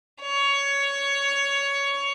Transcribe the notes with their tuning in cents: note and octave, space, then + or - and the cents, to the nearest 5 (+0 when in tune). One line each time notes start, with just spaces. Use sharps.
C#5 +10